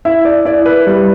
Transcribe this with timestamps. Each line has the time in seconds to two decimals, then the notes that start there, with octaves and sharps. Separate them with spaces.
0.05 E4 E5
0.25 D5
0.45 E4 D5
0.66 B4
0.87 G3